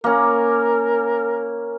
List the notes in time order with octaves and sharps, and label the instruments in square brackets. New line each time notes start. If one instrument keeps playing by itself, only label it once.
[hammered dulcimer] A#3 C#4 [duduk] A#4